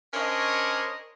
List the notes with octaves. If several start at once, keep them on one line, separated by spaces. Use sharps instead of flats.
C#4 D4 A#4 C5 C#5 D#5